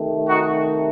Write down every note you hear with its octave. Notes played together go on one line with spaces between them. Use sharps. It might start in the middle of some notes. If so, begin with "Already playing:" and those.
Already playing: C3 D#3 A3
D#4 F#4